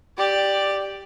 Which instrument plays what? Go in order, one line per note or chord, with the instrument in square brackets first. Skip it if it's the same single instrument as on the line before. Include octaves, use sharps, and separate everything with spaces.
[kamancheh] G4 D5